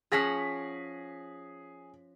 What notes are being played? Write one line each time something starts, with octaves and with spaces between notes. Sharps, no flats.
F3 C#4 G#4 F#5 A#6 B6